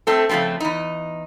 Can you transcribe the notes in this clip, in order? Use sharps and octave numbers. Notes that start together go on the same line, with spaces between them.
A3 C4 A4
C#3 F3 F#3 A3 C4
E2 D#4